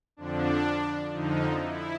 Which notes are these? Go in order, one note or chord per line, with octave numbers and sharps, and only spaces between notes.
F2 D3 F3 D4
F2 D3 F3 D#4
E4